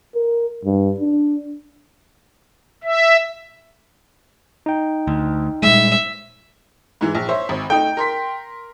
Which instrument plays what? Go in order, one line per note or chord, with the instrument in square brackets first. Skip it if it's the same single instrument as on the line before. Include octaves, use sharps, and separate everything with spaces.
[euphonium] A#4
G2
D4
[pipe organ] E5
[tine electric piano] D#4 G5
[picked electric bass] D2
[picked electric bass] A#2 G3 G#3 [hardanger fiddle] E5
[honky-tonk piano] G#2 E3
A#1
C5 C#5 E5
G#1
[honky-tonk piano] A3 D#4 [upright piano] G5
[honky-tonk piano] A#4 C6 B6